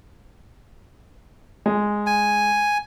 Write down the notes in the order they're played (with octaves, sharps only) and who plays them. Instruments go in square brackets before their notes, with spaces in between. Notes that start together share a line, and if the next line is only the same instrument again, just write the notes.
[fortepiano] G#3
[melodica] G#5